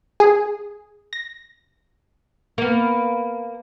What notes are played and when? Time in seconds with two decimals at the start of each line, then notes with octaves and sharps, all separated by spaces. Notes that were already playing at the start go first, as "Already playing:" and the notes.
0.20 G#4
1.13 A#6
2.58 A#3 B3